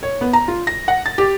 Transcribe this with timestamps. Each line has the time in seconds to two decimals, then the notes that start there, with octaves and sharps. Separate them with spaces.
0.03 C#5
0.21 B3
0.33 A#5
0.48 F4
0.67 A#6
0.88 F#5
1.06 A6
1.18 G4